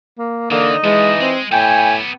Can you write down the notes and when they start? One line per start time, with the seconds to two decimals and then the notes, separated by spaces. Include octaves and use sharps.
0.18 A#3
0.51 D3 E3 A#3 D#4 D#5
0.84 E3 F3 G#3 B3
1.20 G#3 C4
1.52 A2 B3 G4 G5 G#5